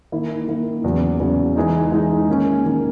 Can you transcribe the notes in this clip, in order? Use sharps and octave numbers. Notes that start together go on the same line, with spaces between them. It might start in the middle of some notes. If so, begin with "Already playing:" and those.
D#3 A#3 E4
D#3 A#3 E4
E2 C#3 F#3
E2 C#3 F#3
E3 G#3 D#4
E3 G#3 D#4
D#3 A#3 C#4
D#3 A#3 C#4